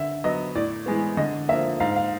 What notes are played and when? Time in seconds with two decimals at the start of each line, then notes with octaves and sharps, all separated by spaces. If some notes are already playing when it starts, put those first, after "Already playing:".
Already playing: D3 E5
0.24 F#3 B3 D#5
0.55 A2 D5
0.86 E3 G#3 B3
1.17 D3 D#5
1.48 F3 A#3 E5
1.80 G#2 F5
1.96 F5